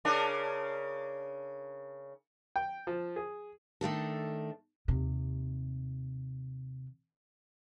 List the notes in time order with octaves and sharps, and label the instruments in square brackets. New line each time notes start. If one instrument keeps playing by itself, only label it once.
[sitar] C#3 D4 A#4
[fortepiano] G5
F3
G#4
[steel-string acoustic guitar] D#3 A3 D4 A4
[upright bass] D#2 C3